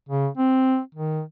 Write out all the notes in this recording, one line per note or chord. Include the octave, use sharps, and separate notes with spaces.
C#3
C4
D#3